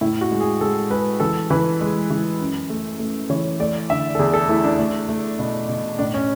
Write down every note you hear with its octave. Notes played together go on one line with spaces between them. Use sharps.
A2 E4
F#4
G#3
G#4
G#3 A4
G#3 B4
E3 A4
E3 B4
G#3
E3
F#2
A3
A3
E3 C#5
A3 D5
D3 E5
A4
E2 G#4
A4
A3 E4
D4
A3
A3
B2
B2
A2 D4
C#4